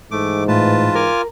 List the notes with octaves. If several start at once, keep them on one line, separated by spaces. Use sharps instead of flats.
G#2 E3 A3 D6
A2 F4 B4 A5
A#4 G#5 D6 F6